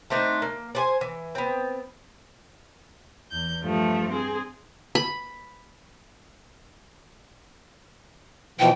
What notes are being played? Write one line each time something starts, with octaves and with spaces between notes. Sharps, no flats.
A3 C4 D4 D#4
A#3
D4 C5 G#5
E3
B3 C4
E2 G6
G2 F3 A3
C4 G#4
B5
B2 E3 F3 G5